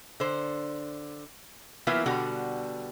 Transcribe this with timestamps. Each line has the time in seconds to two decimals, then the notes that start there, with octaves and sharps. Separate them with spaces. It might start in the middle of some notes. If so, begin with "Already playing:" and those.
0.20 D3 C5
1.87 E3 F#3 A#3 B3 E4 F4
2.06 B2 D3 G3 F#4 F#5